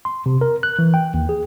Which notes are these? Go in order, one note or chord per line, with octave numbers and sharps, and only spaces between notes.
C6
C3
A#4
F#6
E3
G5
D#2
G#4